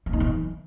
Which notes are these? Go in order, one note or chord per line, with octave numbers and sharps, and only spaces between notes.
A#3
D#4
E3